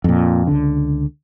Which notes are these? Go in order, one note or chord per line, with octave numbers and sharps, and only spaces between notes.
F2 A#2
C#2 D3